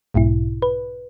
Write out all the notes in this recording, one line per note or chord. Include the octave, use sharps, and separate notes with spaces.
B1 G#2 B2 E4
B4